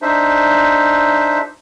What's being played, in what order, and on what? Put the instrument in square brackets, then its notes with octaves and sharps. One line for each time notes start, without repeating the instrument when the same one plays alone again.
[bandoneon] D4 D#4 C5 E5